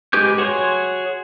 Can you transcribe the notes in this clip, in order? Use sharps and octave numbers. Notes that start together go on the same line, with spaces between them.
G#3 G4 B4 D6 G6
F#4 G#4 C#5 C6